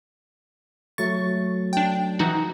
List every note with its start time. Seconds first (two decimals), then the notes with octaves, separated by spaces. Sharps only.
0.98 F#3 A3 C#6 A6
1.73 D4 G5
2.19 E3 D#4 F#4